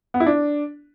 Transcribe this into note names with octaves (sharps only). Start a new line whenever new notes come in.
B3
E4
D4